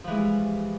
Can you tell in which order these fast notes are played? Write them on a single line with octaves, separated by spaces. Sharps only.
F3 E3 G#3 E4 G3